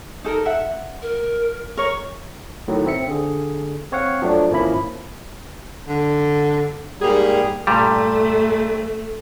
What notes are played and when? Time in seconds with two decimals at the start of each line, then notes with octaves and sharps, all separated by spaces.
0.24 D#4 A4 A#4
0.46 E5 F#5
1.02 A#4
1.77 A#4 C#5 C#6
2.68 A2 D#3 F#3
2.86 C4 E5 C#7
3.08 D3 G#4
3.92 C4 C#5 F5 F#5
4.22 F3 F#3 A3 D4
4.50 G#1 F3 A#3 C#4 E4 B5
5.88 D3
7.01 G#2 G3 A#3 G#4
7.67 G2 A#2 G3 A3